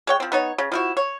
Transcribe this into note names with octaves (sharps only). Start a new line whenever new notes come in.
G#3 C#5 G5
F3 C4
B3 D#4 C#5
C#3
F3 E4 F#4
C#5